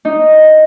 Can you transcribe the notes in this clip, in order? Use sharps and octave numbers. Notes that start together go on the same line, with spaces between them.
D#4